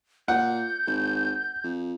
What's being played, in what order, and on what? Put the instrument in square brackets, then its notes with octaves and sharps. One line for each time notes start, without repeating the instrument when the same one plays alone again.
[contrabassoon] A#2 [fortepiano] F#5 [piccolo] G6
[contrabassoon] G#1
F2